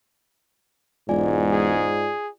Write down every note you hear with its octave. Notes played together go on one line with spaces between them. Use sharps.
E1 G#2 F4 D5 G#5
G#4